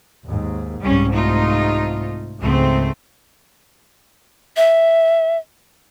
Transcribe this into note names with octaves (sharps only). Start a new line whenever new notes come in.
D#2 G#2
C2 G#2 G3 C#4
A3 D#4 F4
C#2 G#2 A3 C4
E5